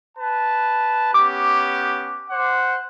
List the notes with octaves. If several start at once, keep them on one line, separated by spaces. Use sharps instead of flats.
B4 A5
B3 C#4 G4 D6
C5 F#5